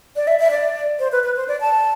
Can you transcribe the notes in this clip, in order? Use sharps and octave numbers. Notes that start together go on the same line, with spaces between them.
D5
E5
E5
D5
C5
B4
B4
C5
D5
A5